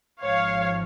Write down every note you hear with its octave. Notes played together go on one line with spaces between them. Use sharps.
G#1 G#2 F3 C#5 F5